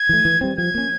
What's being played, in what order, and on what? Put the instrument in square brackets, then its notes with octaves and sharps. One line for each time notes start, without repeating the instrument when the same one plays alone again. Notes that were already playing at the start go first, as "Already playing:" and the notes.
Already playing: [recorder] G#6
[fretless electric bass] E3 A3
E3
G3 C4
[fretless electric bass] F3 [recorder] G#6
[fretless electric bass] A#3 C#4